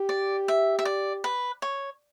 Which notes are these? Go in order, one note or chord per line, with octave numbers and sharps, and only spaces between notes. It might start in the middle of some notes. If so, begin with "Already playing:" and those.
Already playing: G4
D5
E5
E5
D5
B4
C#5